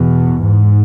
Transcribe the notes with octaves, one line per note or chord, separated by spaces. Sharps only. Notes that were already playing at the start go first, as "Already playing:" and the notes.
Already playing: E2 B2
G#2